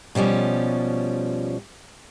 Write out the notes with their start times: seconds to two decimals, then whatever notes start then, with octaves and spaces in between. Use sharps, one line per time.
0.15 B2 F3 G3 C#4